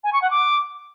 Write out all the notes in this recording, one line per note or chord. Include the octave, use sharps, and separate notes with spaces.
G#5
C#6
F#5
D6